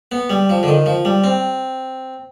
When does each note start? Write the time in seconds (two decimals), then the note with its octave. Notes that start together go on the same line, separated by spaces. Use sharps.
0.12 B3
0.30 G3
0.49 F3
0.63 D3
0.68 D#3
0.86 F3
1.05 G3
1.24 C4